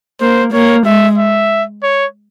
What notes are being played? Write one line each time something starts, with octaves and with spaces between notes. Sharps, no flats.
A#3 C5
A#3 C#5
G#3 E5
E5
C#5